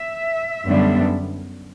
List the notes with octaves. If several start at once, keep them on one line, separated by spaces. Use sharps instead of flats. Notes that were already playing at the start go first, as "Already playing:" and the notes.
Already playing: E5
F#2 D3 G3 B3 D4